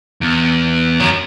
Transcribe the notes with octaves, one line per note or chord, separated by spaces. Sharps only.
E2
F#2